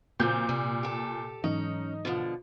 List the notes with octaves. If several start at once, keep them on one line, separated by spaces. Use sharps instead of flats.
A#2 C#3 F3 F#3 C4 G6
C3 G3
G4 A4
G#2 E3 F#3 C#4 D#4
B2 D3 F3